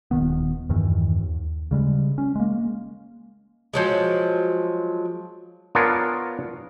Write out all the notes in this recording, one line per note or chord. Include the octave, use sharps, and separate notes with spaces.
D#1 F2 D#3 B3
E2 G2 D#3 E3
D#2
C#3 G3 G#3
C#4
G#3 A#3
F3 F#3 G#3
B3 D4 F4 A#4 C#5 G#5